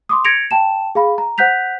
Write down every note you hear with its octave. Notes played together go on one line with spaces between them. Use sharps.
C6 D6 D#6
G#6 A#6 C#7 D7 F7
G5 A5 E7
G#4 F5 B5
A#5
C5 F#5 F#6 G6 B6 F7